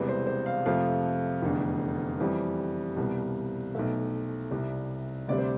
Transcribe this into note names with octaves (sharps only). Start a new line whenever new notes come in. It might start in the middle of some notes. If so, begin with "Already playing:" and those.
Already playing: E1 E2 C3 G3 B4
C5
C5
F5
F2 C3 F3 A3 F5
F1 E2 D3
F2 E3 G3
C2 B2 G3
B1 B2 A3 E5
C2 C3 G3
D2 C3 G3 D5
C5